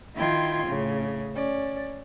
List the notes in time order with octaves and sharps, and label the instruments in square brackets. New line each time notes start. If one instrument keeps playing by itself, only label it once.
[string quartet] D#3 E4 F4 G5 C6 G#6
A2 C#3
C#4 D5